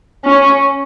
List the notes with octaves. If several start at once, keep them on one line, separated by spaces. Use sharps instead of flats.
C#4